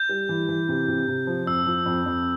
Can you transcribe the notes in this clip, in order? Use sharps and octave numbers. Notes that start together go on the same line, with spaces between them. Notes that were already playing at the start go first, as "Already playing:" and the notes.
Already playing: G6
G3
E3
E3
C3
C3
C3
F3
F2 E6
F3
F2
F2